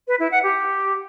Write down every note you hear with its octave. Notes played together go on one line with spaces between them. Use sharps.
B4
E4
F#5
G4